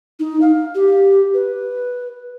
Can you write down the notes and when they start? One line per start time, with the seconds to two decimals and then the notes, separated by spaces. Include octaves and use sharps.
0.20 D#4
0.41 F5
0.75 G4
1.34 B4